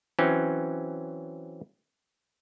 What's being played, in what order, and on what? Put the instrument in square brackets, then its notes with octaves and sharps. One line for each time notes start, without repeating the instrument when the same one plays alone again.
[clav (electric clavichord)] E3 F#3 C4 C#4